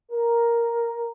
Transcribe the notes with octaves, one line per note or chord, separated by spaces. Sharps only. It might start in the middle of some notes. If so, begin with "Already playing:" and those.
A#4